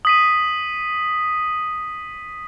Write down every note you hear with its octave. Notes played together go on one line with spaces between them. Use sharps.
D#6 B6 D#7